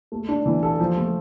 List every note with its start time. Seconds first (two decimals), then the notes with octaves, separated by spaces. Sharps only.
0.12 A3
0.28 D4
0.46 E3
0.63 A4
0.80 F3
0.97 A3